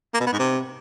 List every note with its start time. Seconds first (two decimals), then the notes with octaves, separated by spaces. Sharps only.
0.14 A#3
0.20 B2
0.26 B3
0.33 G#2
0.39 C3